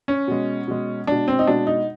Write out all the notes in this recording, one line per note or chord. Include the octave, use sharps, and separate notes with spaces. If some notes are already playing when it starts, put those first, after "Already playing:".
C#4
B2 G#3
B2 G#3
B2 G#3 D4
C4
D#4
B2 G#3 D4
D#4